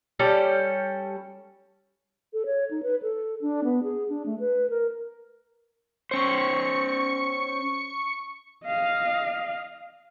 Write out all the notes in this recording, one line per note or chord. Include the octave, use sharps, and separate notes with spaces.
G3 C#4 A4 D5
A4
C#5
D#4
B4
A4
D4
B3
G#4
D4
A3
B4
A#4
C#4 C5 C#6 C#7
D#5 F5